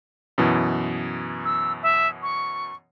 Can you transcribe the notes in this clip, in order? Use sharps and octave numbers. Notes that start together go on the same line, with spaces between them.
F#2 B2 E3
E6
E5
C#6